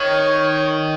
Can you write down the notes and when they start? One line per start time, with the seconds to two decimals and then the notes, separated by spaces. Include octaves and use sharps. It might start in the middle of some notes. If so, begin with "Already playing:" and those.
Already playing: D#3 C#5